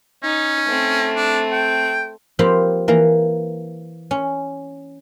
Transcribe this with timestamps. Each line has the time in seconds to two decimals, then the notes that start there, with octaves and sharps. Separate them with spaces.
0.23 C#4 D#4
0.66 A3 C4
1.16 D4
1.52 G5
2.39 F3 A#3 C4 G4 F5 B5
2.88 E3 A#3 A#4 A#5
4.11 C#4